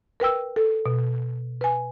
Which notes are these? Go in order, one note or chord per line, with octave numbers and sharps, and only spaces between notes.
A#4 B4 G5 E6
A4
B2
B4 G#5